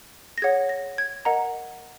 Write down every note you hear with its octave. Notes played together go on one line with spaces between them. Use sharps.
A#6
G#4 C#5 F#5 G#6
A#6
G#6
A#4 D#5 F#5 A#5